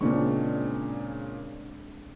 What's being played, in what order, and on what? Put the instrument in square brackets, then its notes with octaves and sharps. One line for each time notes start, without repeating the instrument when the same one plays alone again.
[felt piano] A#2 C#3 C#6 [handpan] G#3 C4 D4